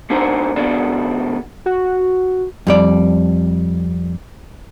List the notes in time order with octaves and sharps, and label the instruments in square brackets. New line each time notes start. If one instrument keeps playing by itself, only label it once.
[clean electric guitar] A#3 D4 D#4 C5 F#5
D#2 B2 D4
[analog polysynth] F#4
[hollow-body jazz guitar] F2 G3 D5